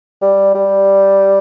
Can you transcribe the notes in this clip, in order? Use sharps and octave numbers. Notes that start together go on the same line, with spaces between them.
G3
G3